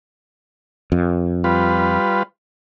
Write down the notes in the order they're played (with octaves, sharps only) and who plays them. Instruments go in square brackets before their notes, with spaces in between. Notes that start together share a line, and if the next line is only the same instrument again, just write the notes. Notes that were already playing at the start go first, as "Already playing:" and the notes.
[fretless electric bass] F2
[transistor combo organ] G3 F4 B4